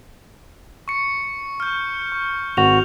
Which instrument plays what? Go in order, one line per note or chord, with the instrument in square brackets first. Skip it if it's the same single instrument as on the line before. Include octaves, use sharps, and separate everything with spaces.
[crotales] C#6 C#7
F6 G6
C#6
[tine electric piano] G#1 F#4 [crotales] F7